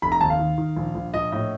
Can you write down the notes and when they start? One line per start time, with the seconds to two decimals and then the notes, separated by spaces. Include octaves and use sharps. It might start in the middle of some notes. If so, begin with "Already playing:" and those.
0.02 F1 B5
0.12 A#5
0.21 D#2 A5
0.30 F5
0.39 D#3
0.58 D#3
0.76 A#1
0.95 A#1
1.14 A#1 D#5
1.32 A2 D#5